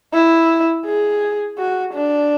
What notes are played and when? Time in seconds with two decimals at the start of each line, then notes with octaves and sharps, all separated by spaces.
0.13 E4
0.85 G#4
1.58 F#4
1.93 D4